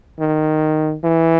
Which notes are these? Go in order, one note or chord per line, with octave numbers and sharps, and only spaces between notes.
D#3
E3